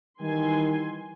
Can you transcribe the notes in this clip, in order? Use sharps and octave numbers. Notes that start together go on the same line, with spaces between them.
D#3 E3 G3 G#5 C6